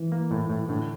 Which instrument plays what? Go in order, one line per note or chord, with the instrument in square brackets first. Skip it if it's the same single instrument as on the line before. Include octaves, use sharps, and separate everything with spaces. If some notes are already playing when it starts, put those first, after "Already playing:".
Already playing: [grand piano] E3
[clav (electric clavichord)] A#3
A2
A2
[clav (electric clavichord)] A2 [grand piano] D3